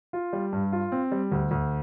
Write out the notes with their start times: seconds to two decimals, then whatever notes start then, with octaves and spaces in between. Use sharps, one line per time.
0.13 F4
0.33 G3
0.53 G2
0.72 F4
0.92 C4
1.12 G3
1.32 D2
1.51 D2